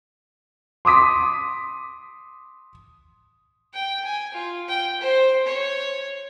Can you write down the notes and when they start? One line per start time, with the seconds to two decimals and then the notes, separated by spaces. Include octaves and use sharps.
0.85 C6 D6 D#6 B6
3.74 G5
4.05 G#5
4.34 F4
4.68 G5
5.01 C5
5.46 C#5